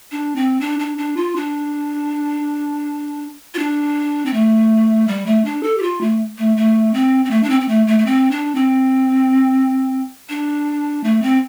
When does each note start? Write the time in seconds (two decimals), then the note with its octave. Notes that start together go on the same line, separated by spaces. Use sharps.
0.12 D4
0.36 C4
0.61 D4
0.79 D4
0.98 D4
1.17 F4
1.36 D4
3.54 F4
3.59 D4
4.26 C4
4.34 A3
5.08 G3
5.26 A3
5.45 D4
5.63 A4
5.78 G4
5.82 F4
6.01 A3
6.38 A3
6.57 A3
6.94 C4
7.25 C4
7.31 A3
7.43 D4
7.50 C4
7.61 C4
7.68 A3
7.87 A3
7.99 A3
8.06 C4
8.31 D4
8.55 C4
10.30 D4
11.04 A3
11.22 C4